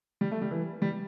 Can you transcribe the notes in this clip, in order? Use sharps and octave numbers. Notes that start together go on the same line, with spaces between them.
G3
A3
G3
E3
G3